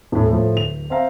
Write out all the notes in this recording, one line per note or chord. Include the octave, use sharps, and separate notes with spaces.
D#1 A2
A2 F3
D1 F7
C4 C5 E5 F5 A#5